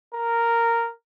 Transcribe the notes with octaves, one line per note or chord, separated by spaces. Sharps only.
A#4